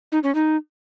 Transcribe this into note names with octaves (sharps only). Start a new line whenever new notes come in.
D#4
C#4
D#4